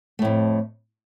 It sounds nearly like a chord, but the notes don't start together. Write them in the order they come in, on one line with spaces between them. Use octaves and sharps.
A3 A2 F2